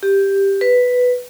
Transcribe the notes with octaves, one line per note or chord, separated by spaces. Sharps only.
G4
B4